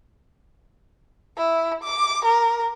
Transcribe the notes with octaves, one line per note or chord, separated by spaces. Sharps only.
E4
D6
A#4